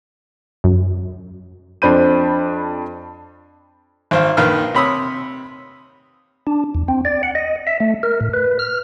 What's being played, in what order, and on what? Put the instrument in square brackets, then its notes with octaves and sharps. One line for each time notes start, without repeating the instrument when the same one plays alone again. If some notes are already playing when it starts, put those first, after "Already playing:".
[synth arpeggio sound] F#2
[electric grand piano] F2 D4 C5 B5 G6 D#7
[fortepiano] G#1 C5 F5
A#1 D#3 B4 F5 F6
C3 C#5 B5 D#6 E6
[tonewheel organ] D4
E2
C4
D5
F#5
D#5
E5
A3
A#4
A2
B4
F6